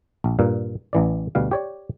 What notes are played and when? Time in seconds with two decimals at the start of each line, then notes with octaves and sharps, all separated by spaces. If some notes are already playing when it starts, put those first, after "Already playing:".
0.24 A#1
0.39 G2 A#2 A#3
0.93 A1 E3 D5
1.35 D2 B2 G3 F5
1.51 G4 C#5 D5